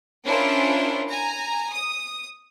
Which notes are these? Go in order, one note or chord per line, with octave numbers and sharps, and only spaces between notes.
C#4 D4 E4 F4 A#4 C5
G#5 A#5
D#6